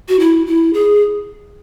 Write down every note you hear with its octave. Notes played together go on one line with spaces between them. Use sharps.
F#4
E4
E4
G#4